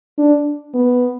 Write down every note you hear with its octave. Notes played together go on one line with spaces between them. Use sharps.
D4
B3